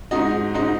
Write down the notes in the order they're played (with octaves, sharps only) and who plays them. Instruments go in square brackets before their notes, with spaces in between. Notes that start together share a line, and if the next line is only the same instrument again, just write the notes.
[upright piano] G#2 G#3 D#4 F#4 D#5
G#2 G#3 D#4 F#4 D#5